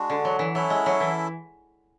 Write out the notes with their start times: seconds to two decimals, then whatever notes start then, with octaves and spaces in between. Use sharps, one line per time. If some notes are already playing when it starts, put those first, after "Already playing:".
Already playing: G#3 D4 F#4
0.10 D3
0.25 F#3
0.39 E3
0.55 F#3 C#4 E4 A4 E5
0.70 G#3
0.86 F#3
1.00 E3